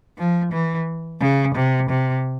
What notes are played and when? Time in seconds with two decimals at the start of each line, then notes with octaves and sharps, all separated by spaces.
0.18 F3
0.53 E3
1.21 C#3
1.55 C3
1.90 C3